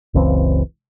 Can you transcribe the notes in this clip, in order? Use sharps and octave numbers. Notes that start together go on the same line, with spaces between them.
F#1 C#2 E3 C4